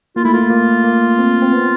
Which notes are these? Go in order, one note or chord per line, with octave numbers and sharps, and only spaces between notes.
A#3 F4
A3 E4
A#3 F4
A#3
A#3
C4
C4
B3